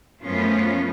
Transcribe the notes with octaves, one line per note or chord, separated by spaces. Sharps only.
F#2 F3 A3 B3 C#4 F4